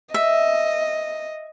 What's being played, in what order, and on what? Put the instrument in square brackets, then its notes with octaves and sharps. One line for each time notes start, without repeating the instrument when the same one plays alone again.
[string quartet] D#5 [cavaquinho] E5